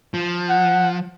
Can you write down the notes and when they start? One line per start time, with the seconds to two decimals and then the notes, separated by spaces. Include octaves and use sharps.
0.14 F3
0.49 F#5